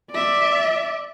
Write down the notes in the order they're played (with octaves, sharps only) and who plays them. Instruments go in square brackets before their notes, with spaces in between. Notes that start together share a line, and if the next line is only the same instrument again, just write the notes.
[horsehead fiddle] D5 E5